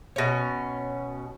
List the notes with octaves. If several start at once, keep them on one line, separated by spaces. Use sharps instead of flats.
B2 C#4